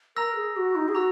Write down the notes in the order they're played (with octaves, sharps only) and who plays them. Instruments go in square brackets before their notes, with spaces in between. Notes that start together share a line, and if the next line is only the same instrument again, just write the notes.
[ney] A#4 [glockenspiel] A#5 E6 A#6
[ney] G#4
F#4
D#4
G#4
[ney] F#4 [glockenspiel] A#5 E6